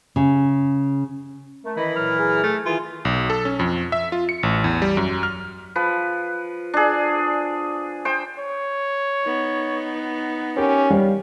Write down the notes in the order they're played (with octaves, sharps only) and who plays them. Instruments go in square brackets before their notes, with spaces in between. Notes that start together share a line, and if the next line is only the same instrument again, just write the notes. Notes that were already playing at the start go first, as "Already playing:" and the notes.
[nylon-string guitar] C#3
[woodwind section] A3 [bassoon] A#4
[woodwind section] D#3 D#5 B5 [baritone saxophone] E3
[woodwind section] A#2 F#3 F6
[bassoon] G#4
[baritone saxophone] A3
[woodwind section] D#3 G#4 G#5 [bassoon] E3 [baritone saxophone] F4
[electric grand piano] B1
A4
C#4
F2
E5
F4
C#7
A1
E2
G3
F#2
F6
[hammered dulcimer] F3 B4
D4 G#4
C5 G5
[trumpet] C#5
[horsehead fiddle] B3 D#4
[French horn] C#4 [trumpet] G4 [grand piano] A#4
[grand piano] G3 C#5 [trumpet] F5